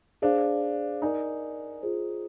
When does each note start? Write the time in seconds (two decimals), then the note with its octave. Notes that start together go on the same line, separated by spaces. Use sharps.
0.22 D4 G#4 C5 F5
1.02 D#4 A#4 D5 G#5
1.82 F4 G#4 C5